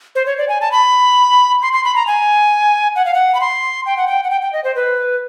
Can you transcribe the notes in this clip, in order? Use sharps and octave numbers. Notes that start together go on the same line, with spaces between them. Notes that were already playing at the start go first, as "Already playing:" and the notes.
C5
C#5
D5
G#5
A5
B5
C6
C6
B5
A#5
G#5
F#5
F5
F#5
B5
C6
G5
F#5
G5
F#5
G5
G5
D#5
C5
B4